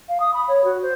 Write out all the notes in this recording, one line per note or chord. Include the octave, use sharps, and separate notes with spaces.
F5
D#6
B5
C#5
F#4
C5